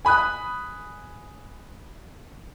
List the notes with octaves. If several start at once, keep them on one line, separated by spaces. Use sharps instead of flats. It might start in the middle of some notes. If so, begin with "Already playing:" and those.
G#5 B5 D#6 F#6